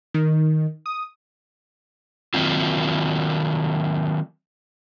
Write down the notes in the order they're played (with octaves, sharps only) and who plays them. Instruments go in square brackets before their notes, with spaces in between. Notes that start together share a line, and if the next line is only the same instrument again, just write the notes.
[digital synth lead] D#3
D#6
[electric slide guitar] D#3 F#3 A#3 C4 F4